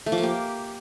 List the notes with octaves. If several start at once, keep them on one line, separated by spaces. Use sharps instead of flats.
A3
F3
A#3
G4